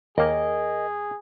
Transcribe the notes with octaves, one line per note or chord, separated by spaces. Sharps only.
D#2 A#3 G#4 A#4 D#5